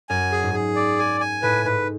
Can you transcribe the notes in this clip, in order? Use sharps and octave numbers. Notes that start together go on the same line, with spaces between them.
F#2 G#5
G#4
G#2
G#4
D5
G#5
G#5
A2 B4
G#2 B4